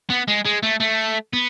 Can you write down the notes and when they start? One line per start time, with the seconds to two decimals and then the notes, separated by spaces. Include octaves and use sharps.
0.10 B3
0.28 G#3
0.45 G#3
0.63 A3
0.80 A3
1.33 B3